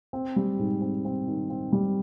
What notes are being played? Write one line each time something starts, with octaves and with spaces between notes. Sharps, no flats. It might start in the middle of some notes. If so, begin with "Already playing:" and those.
C4
G3
G#2
C4
C4
D#3
C4
G3